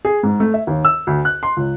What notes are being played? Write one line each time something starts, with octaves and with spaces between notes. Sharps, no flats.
G#4
G#2
A3
E5
D#2
E6
D2
F#6
C6
C#2